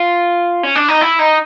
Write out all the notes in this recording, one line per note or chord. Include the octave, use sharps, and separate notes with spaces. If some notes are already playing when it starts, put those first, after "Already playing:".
Already playing: F4
C#4
D4
D#4
E4
D#4